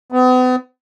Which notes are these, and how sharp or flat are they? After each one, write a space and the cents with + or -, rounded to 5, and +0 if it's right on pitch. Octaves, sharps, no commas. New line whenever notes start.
B3 +40